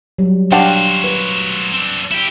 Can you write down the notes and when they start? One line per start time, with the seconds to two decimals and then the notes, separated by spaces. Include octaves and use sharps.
0.19 F#3 G3
0.52 F#3 D4 G4 C5 F5 F#5
1.04 B4
1.73 C4 D4
2.11 E4 G4